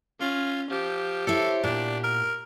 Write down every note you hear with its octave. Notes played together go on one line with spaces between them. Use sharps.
C#4 F4
F3 G4
E4 A4 C5 C#5
A#2 B3 D4
A#4